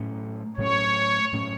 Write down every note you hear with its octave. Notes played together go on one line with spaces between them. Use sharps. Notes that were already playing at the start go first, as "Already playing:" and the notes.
Already playing: A2 F#3 A3 C#4
A2 F#3 A3 C#4 C#5
A2 F#3 A3 C#4